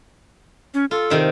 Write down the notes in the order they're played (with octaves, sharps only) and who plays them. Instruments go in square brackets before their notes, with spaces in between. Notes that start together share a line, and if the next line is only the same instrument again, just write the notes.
[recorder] C#4
[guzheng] F4 [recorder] A4
[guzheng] C3 D#3 D5